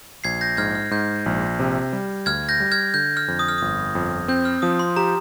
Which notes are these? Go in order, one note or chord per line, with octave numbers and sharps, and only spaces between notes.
A#1 G#6 C7
G6 A#6
G#2 F6 G#6
F6
G#2 G6
A#1
C3
G3
D2 F6 G#6
G6 A#6
G3
F6 G#6
D3 G6
F6
F2
D#6
F6
G1 D#6
F2
C4 G6
F6
F3 D#6
C6
G4 A#5